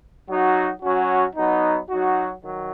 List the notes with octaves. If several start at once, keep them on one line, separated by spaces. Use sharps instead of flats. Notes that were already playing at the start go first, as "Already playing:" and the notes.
F#3 D#4 F#4
F#3 C#4 F#4
F#3 B3 D#4
F#3 D#4 F#4
D#3 F#3